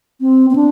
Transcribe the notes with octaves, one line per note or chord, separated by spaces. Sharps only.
C4
C4
D4